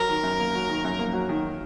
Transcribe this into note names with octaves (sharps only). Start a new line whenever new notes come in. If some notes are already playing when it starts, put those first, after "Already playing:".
Already playing: F#3 A#4
D#3
F#2
A#3
F#3
D#3
F#2
A#3
F#3
D#3